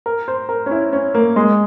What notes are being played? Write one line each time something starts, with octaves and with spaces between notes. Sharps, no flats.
A#4
C5
A#4
C#4
E4
C#4
A#3
G#3